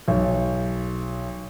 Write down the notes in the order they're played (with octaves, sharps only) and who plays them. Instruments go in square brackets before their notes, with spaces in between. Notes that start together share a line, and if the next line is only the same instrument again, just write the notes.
[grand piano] B1